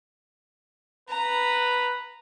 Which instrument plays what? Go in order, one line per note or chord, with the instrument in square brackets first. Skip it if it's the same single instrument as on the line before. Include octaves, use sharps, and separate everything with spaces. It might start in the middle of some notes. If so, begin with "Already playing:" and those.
[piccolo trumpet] B4 [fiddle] A#5